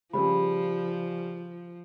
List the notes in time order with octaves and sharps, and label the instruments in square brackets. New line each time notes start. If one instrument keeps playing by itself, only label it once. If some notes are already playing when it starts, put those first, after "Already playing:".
[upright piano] C#3 G3 G#4 [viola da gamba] F3 [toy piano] B5